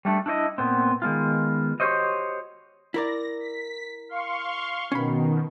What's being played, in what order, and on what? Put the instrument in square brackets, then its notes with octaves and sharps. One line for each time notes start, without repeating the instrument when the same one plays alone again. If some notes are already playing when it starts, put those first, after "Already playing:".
[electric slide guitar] G3 A3 D4
D4 E4 C#5 D#5
A#2 B3 C4
D#3 G#3 B3 F4
F#4 G4 A#4 C5 C#5 D#5
[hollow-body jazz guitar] E4 A#4 D5 [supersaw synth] A#6
[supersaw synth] B6
F5 C6 C#6
[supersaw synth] B2 D#3 [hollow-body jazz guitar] C#4 B5